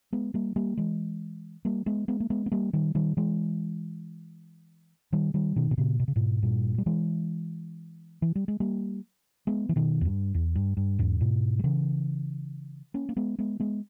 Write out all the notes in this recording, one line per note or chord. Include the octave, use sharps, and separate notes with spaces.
G#3 B3
G3 A#3
G3 A#3
E3 G#3
G3 A#3
G#3 B3
G#3 B3
A#3
G#3 B3
B3
G3 A#3
D#3 G3
D#3 G3
E3 G#3
D#3 G3
D#3 G3
B2 D#3
B2
A#2 C#3
B2
C#3
G#2 B2
G2 A#2
G3
E3 G#3
E3
G3
G#3
G3 A#3
G#3 B3
E3
B2 D#3
E2
G2
E2
G2
G2
E2 G#2
G#2 B2
G3
C#3 E3
A#3 C#4
A#3
G#3 B3
G#3 B3
G#3 B3